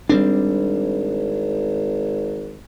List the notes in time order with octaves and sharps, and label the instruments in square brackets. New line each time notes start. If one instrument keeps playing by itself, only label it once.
[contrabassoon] G#1 [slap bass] G3 C4 D4